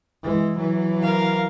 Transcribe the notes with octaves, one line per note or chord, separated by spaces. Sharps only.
E3 G#3
E3 F#3
A#4 F5